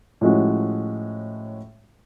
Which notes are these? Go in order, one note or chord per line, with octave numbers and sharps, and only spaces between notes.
A2 F3 G#3 C#4 F#4